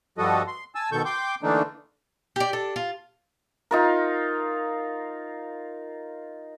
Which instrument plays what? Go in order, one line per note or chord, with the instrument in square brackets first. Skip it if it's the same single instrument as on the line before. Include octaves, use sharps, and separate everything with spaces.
[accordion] G2 F3 G3 F#4 A4 D#5
C6
G#5 A5 E6
B2 D#3 A4 C#6 G6
G5 C6 D6 G6
D3 E3 A3 A#3 D4 D#4
[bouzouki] G4 D5
D4 A4
F4
[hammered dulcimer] D#4 F4 A#4